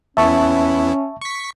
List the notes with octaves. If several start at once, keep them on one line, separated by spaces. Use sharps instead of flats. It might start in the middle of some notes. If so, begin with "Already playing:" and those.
E2 B3 C#4 E4 E5 A5 C#6
C#6 B6